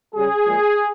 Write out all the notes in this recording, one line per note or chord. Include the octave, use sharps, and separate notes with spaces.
C#3 G3 G#4
A#2 F3 G#3